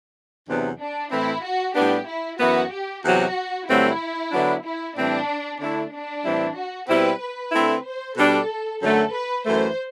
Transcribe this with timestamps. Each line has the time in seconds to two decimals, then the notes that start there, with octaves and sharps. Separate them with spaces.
0.47 E2 C3 F#3 B3 D4
0.80 D4
1.11 A2 E3 A3 C4 E4
1.43 F#4
1.75 A2 G3 B3 D4 G4
2.07 E4
2.39 F#2 E3 B3 F#4
2.72 G4
3.03 E2 C3 F#3 F#4
3.68 G2 D3 F#3 A3 C4 E4
4.32 D3 F#3 B3 D4
4.64 E4
4.95 A2 E3 G3 C4 D4
5.60 D3 A3 D4 E4
5.92 D4
6.25 A2 E3 G3 C4 E4
6.56 F#4
6.88 B2 G3 C4 E4 B4
7.21 B4
7.52 D3 A3 C4 E4
7.85 C5
8.16 B2 G3 D4 A4
8.81 F#2 D3 F#3 A3 A4
9.13 B4
9.45 F#2 E3 A3 C5